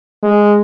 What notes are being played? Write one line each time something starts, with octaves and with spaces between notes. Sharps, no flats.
G#3